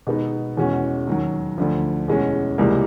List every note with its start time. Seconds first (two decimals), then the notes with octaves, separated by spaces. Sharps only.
0.07 B2 G#3 B3 D#4
0.57 E2 B2 G#3 C#4 F#4
1.07 D#2 D#3 F#3
1.58 D2 D3 F3
2.08 E2 B2 G#3 C#4
2.58 C#2 C3 E3 G3 A#3